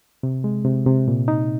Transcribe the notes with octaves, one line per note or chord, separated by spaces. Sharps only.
C3
G#3
C3
C3
A#2
D#4